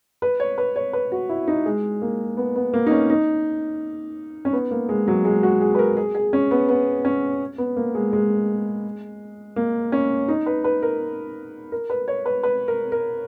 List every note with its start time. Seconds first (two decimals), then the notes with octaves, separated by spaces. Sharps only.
0.22 B4
0.40 C#5
0.58 B4
0.76 C#5
0.93 B4
1.12 F#4
1.29 E4
1.48 D#4
1.66 G#3
2.02 A#3
2.37 B3
2.56 B3
2.74 A#3
2.86 D#4
2.91 C#4
3.10 D#4
4.45 C#4
4.53 B3
4.71 A#3
4.89 G#3
5.08 F#3
5.25 G#3
5.43 F#4
5.61 G#4
5.75 B4
5.79 A#4
5.97 G#4
6.15 G#4
6.33 C#4
6.51 B3
6.69 B3
7.05 C#4
7.58 B3
7.77 A#3
7.95 G#3
8.13 G#3
9.56 A#3
9.92 C#4
10.28 D#4
10.46 B4
10.64 B4
10.83 A#4
11.72 A#4
11.90 B4
12.08 C#5
12.26 B4
12.43 B4
12.68 A#4
12.92 A#4